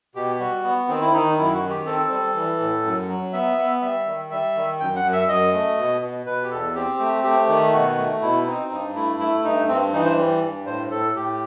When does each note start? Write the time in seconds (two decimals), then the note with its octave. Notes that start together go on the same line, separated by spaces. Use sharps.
0.15 B2 G4
0.40 G3 F#4
0.64 B3
0.88 D#3 C4
1.01 E4
1.13 D#3 D#4
1.37 F#2 E4
1.54 F#4
1.62 D#3
1.70 G4
1.86 C4 A4
2.11 G3
2.35 E3
2.60 A2
2.84 F#2
3.09 F#3
3.33 B3 E5
3.57 B3
3.82 G3 E5
4.06 D#3
4.31 G3 E5
4.55 D#3
4.80 F#2 G5
4.96 F#5
5.04 F#2
5.12 E5
5.28 F#2 D#5
5.53 A3
5.77 B2
6.02 B2
6.26 B2 B4
6.44 G4
6.51 E2 A4
6.75 C4 G4
7.00 A3
7.24 A3 G4
7.48 D#3
7.73 B2 F#4
7.98 A3
8.22 B2 E4
8.46 C4 D#4
8.70 G2 D#4
8.95 A3 E4
9.20 A3 E4
9.45 G2 D#4
9.69 G2 C4
9.93 E3 D#4
10.05 C5
10.18 G3
10.42 G2
10.67 A2 C5
10.91 A2 A4
11.15 A2 G4